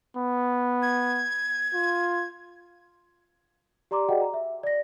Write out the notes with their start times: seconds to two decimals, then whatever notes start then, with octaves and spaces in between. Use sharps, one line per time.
0.17 B3
0.82 G#6
1.74 F4
3.91 G4 D5 A#5 C6 D6
4.09 F#4 G#4 D5 D#5 F#5 G5
4.21 A#5
4.34 E5
4.63 D5 A#6